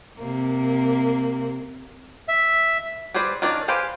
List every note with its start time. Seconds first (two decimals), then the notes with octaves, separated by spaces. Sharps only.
0.17 C3 A#3
2.28 E5
3.14 G3 G#4 B4 C5 D5
3.42 D#3 C#4 D4 A#4 D5
3.68 G4 B4 C5 F5 G#5